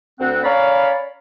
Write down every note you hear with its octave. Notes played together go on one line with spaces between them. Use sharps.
D2 C4 F#5
C#4 C#5 D5 F5 A#5 B5